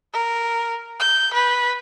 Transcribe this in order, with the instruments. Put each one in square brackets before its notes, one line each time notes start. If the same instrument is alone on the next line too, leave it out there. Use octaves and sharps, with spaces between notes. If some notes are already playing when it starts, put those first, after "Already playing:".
[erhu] A#4
G6
B4